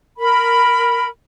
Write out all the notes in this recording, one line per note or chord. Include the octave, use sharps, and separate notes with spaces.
A#4 B5